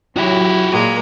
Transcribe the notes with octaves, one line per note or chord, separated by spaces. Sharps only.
F#3 E4 F#4 G4
A#2 G#3 A#3